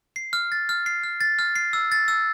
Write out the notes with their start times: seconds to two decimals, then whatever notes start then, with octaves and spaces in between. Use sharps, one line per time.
0.16 C7
0.33 F6
0.52 A6
0.69 F6
0.86 C7
1.04 F6
1.21 A6
1.39 F6
1.55 C7
1.73 E6
1.92 A6
2.08 E6